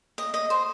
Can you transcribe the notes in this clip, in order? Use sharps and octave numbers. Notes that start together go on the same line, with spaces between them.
D#5
D#5
C5